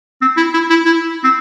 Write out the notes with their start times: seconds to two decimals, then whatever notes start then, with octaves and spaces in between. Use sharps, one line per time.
0.21 C4
0.37 E4
0.54 E4
0.70 E4
0.85 E4
1.24 C4